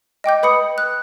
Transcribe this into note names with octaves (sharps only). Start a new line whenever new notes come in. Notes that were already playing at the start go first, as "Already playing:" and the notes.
D#5 G5 D6 G6
B4 B5 D#6 C#7
F#6